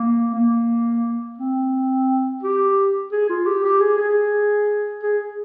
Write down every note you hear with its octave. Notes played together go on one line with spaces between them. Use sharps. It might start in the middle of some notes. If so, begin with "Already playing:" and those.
Already playing: A#3
A#3
C4
G4
G#4
F4
G4
G4
G#4
G#4
G#4